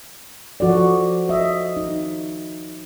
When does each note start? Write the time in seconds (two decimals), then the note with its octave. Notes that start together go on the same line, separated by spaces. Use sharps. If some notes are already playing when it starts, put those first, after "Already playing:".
0.60 F3 F#4 A4 D5
1.29 D#5 E5
1.77 D#4